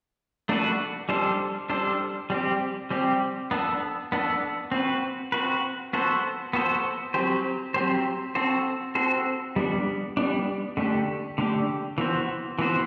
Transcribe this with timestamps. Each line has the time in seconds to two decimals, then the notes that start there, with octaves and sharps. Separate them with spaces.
0.49 A3 D4 F#4 B4
1.09 G3 D4 A4 C5
1.70 G3 D4 A4 C5
2.30 G3 C4 G4
2.90 G3 C4 G4
3.51 B3 D4 A4
4.12 B3 D4 A4
4.72 C4 F#4 B4
5.32 C4 F#4 B4
5.93 B3 F#4 A4 C5
6.53 B3 F#4 A4 C5
7.14 F#3 C4 G4 C5
7.74 F#3 C4 G4 C5
8.35 C4 F#4 A4 C5
8.95 C4 F#4 A4 C5
9.56 G3 B3 D4
10.17 G3 B3 D4
10.77 D3 A3 D4 G4
11.38 D3 A3 D4 G4
11.98 E3 B3 F#4 C5
12.59 E3 B3 F#4 C5